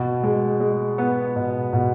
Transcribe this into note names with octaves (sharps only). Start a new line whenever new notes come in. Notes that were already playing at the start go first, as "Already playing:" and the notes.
Already playing: B2
G#3
G#3
B3
B2
B2